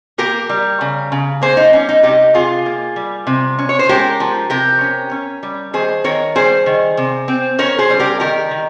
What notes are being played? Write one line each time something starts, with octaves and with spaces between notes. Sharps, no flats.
A#3 G4 A#4
G3
C#3
C#3
A#3 G#4 C5
D#4
G3 C#4
D#4
C3 D#4 G4
C3 F4 G#4
A#3
G3
C3
C#4
C#5
C5
G#3 G4 A#4
F3
C3 G4 A#4
C#4
C#4
G3
D#3 G#4 C5
D#3 A#4 C#5
G3 G#4 C5
D#3
C3
C4
C#4 A#4 C#5
G#4 C5
G3
G4 A#4
D#3 G4 A#4
D#3